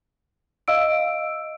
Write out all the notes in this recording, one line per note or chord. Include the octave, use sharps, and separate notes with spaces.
D#5 F5 E6 D7